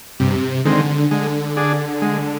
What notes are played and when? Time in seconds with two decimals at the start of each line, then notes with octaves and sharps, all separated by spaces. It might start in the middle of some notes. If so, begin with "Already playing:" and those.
0.20 G2 C3
0.65 D3 D#3 G#3 C4
1.11 D3 G#3
1.57 D4 G#4
2.02 G#3